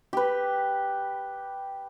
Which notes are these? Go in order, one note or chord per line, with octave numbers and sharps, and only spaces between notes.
G4 B4